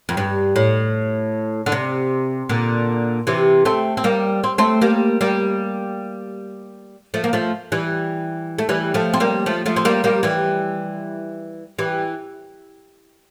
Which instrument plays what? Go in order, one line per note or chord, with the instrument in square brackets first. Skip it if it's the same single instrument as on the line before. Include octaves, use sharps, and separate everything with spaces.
[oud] F2
G2
A2
D3
C3
A#2 D3
C3 E3
A3 C4
C4
G3 A#3
C4
A3 C4
G3 A#3
G3 A#3
F3 A3
A#3
F3 A3
E3 G3
A3
E3 G3
F3 A3
C4
G3 A#3
F3 A3
F3 A3
C4
G3 A#3
G3 A#3
E3 G3
E3 G3